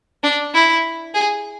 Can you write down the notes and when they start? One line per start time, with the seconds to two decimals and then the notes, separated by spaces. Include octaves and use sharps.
0.23 D4
0.54 E4
1.14 G#4